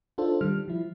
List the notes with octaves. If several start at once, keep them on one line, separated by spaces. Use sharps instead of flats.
D4 D#4 F4 A4 C5
D#3 G3 F6
F3 E4